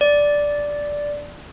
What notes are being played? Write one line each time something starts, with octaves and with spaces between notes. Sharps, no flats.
D5